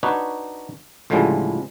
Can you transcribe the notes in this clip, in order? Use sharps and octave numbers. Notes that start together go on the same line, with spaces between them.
D4 D#4 F#4 B4 C#5
C#2 A2 D3 F3 G3 G#3